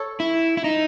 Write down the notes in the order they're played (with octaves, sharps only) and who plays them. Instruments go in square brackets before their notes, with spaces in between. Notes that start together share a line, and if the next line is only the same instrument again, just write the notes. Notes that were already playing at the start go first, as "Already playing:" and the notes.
Already playing: [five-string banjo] A4 C#5
[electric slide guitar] E4
E4
D#4